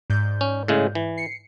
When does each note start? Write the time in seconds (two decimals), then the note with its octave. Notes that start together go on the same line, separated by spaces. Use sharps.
0.10 G#2 D5 G6
0.41 C#4
0.68 A2 C#3 G#3
0.95 E3
1.17 C7 C#7